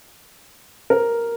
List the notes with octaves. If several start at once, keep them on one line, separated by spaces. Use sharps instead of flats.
A#4